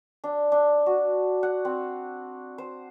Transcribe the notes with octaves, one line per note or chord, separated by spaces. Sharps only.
D4
D4
F#4
F#5
C4
C5